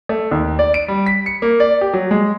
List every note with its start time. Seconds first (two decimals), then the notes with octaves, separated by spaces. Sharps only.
0.09 A3
0.31 D#2
0.59 D5
0.74 D7
0.88 G3
1.06 B6
1.26 C#7
1.42 A#3
1.60 D5
1.81 G4
1.94 F#3
2.11 G#3